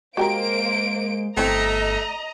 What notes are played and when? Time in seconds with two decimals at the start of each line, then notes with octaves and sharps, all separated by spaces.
0.17 G#3 A#3 F#4 G4 A#4 C5 D7
1.37 G1 A3 C4 E4 D#5 A#5